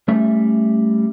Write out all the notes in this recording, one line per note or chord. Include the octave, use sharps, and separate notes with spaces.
G3 A3 C#4 E5